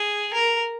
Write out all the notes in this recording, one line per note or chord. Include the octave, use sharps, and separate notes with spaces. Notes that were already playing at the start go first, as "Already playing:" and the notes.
Already playing: G#4
A#4